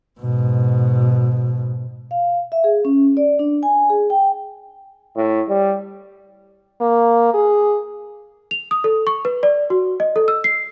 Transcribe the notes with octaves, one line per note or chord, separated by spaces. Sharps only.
G#2 B2
F5
E5
G#4
C#4
D5
D4
G#5
G#4
G5
A2
G3
A#3
G#4
F7
D#6
A4
C#6
B4
D5
F#4
D#5
A4
E6
C7